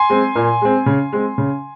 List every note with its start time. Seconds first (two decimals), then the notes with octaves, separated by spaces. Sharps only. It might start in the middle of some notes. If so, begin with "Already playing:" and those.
Already playing: G#5 C6
0.10 G#3 C4
0.36 A#2
0.62 G#3 C4
0.86 C#3
1.13 G#3 C4
1.38 C#3